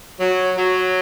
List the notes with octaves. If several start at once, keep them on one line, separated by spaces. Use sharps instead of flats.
F#3
F#3